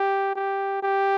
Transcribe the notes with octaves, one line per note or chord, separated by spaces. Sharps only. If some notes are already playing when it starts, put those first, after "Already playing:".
Already playing: G4
G4
G4